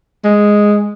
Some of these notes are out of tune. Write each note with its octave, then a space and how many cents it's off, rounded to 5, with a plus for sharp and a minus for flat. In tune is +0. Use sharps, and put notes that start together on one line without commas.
G#3 -5